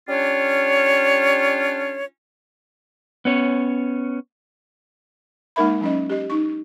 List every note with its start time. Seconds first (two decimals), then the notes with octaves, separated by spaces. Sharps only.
0.09 G3 C#4 D4 F4 C#5
3.25 B3 C#4 C#5
5.56 G#3 A#3 D#4 A#4 E5 B5
5.81 F#3 C#4 D#5
6.10 G4 D#5
6.30 D#4 C#6